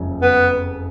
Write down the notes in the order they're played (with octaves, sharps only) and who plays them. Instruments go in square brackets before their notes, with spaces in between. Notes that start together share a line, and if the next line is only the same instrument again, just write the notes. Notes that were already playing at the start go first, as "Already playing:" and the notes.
Already playing: [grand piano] F#1 F2 C#3 F3 G#3
[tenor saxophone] B3